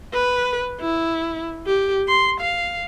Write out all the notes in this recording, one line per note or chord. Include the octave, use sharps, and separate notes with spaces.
B4
E4
G4
C6
F5